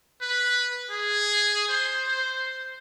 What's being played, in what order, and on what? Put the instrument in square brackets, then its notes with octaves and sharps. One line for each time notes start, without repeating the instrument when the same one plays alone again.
[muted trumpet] B4
G#4
C5
C5